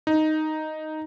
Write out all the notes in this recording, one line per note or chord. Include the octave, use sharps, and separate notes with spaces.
D#4